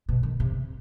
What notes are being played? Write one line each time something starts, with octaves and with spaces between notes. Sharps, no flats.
B2
D#3
C3